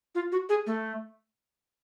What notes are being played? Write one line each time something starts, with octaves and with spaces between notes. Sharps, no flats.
F4
F#4
G#4
A3